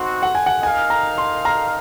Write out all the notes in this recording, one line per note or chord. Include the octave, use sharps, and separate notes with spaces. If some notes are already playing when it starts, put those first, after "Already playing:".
Already playing: C4 D#4 F#4 C6
F#5
G#5
F#5
D#4 A#4 F5 G#5
A#5
C6
A#5